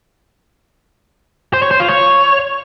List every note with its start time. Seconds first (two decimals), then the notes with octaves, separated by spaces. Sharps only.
1.53 C5
1.62 C#5
1.71 C5
1.80 F4
1.89 C#5